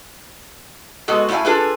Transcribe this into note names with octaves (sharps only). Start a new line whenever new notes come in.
G#3 B3 F#4 A4
A3 E4 C#5 F5 G#5
D4 F4 G#4 A4 B4